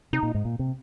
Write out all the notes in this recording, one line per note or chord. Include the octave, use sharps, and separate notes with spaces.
C3 D#4
A#2
G#2
A#2
C3